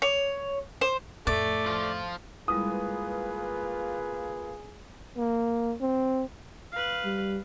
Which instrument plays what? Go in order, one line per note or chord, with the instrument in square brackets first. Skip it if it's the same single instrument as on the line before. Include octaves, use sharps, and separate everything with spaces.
[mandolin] C#5
C5
[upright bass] F2 A2 [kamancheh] A3 [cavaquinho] D5
[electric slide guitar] F3 F4
[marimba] G3 G#3 E4 [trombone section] A#3 F4 B4 [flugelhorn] G#4 [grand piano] D#6
[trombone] A#3
C4
[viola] B4 F5
[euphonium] G3